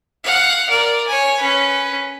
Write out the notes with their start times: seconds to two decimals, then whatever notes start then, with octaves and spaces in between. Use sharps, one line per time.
0.24 F5 F#5
0.70 A#4 D5
1.08 C#5 G#5
1.39 C#4 B4